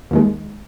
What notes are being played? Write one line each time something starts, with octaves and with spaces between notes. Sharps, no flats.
D#2 D#3 G#3